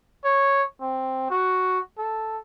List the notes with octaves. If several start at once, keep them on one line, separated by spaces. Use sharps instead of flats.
C#5
C4
F#4
A4